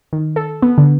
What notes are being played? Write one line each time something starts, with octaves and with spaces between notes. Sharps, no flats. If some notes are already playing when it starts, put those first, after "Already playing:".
D#3
A4
B3
D3